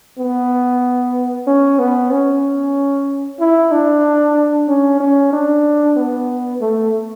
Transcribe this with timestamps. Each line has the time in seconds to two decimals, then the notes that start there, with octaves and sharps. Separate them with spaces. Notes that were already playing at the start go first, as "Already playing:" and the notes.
0.18 B3
1.47 C#4
1.79 B3
2.11 C#4
3.39 E4
3.71 D4
4.68 C#4
5.00 C#4
5.33 D4
5.97 B3
6.61 A3